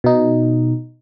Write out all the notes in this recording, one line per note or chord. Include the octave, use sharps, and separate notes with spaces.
B2 D#4